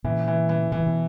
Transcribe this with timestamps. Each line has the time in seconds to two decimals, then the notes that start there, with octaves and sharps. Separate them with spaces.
0.04 A#2 C#3 E3
0.28 E3
0.49 E3
0.72 B2 E3
0.80 A#2
0.87 B2